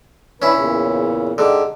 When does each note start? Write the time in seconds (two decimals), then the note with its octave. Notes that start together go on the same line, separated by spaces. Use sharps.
0.42 E3 C#4 D4 E4 B4
0.55 E2 A#2 C#3
1.38 G#2 D3 G4